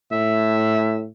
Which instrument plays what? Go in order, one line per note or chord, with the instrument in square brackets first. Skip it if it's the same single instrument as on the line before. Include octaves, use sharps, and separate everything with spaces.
[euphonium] A2 [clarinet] E5